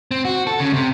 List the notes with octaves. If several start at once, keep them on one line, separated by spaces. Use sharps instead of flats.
C4
F#4
A4
C#3
C3